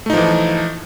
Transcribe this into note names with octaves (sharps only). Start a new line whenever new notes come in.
E3 F3 A3 D#4